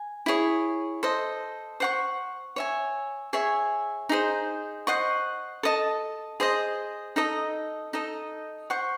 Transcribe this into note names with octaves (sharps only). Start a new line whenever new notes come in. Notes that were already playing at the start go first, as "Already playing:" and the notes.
Already playing: G#5
E4 G#4 C#5
A4 C5 D#5
C5 F#5 C#6
C#5 E5 G#5
G#4 C#5 E5 G#5
D#4 G#4 C5
C5 D#5 F#5 C#6
A4 D#5 A5
G#4 C5 D#5
D#4 A4 D#5
D#4 A4 D#5
C5 F#5 C#6